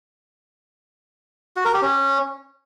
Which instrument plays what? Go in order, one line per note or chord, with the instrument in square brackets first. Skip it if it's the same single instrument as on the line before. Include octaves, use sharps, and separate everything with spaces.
[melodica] F#4
A#4
G4
C#4